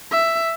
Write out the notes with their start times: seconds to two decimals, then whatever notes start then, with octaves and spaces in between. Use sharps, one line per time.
0.11 E5